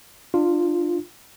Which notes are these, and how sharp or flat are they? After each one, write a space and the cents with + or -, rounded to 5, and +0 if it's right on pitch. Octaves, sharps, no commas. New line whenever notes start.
D4 +30 F4 +0